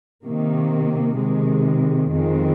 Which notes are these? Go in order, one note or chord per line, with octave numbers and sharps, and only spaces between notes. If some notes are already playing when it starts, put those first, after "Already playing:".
C3 D#3 A#3
C3 D#3 G#3
F2 D#3 G#3 C4